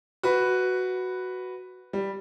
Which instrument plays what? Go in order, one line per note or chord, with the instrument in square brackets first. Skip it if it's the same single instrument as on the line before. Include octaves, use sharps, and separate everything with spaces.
[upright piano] F#4 B4
G3